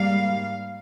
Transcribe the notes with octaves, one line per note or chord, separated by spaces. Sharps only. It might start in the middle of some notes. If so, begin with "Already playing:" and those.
Already playing: G#2 G3 A#3 F5